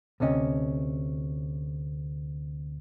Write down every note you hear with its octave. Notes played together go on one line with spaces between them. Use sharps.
D2 C3 C#4 D#5